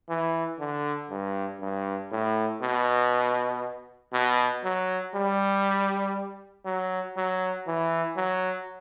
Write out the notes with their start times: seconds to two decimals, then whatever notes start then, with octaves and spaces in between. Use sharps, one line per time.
0.09 E3
0.60 D3
1.10 G2
1.61 G2
2.11 A2
2.62 B2
4.13 B2
4.64 F#3
5.15 G3
6.66 F#3
7.17 F#3
7.67 E3
8.17 F#3